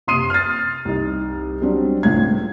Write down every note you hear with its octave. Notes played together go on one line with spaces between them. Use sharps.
F#1 C3 C6 D#6 C7 D#7
F6 A6
C2 D#4
F#3 G3 C4 D4
C#2 A2 G#6